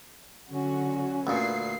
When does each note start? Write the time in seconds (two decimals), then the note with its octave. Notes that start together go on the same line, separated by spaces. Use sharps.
0.50 D3 F#3 C#4 F#4
1.27 D2 A#2 B4 C7